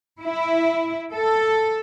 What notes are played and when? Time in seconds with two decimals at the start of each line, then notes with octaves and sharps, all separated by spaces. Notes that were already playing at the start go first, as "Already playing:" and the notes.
0.22 E4
1.14 A4